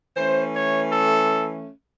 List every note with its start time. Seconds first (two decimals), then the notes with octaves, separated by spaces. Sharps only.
0.15 E3 A3 C#4 C5
0.54 C#5
0.92 A4